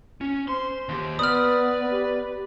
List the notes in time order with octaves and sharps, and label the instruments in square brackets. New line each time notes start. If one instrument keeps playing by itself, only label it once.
[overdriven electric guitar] C#4
[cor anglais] C5 [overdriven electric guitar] C6
[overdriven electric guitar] D#2 G4
[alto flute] B3 [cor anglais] B4 [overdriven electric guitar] D5 [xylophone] D#6 F6
[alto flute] G4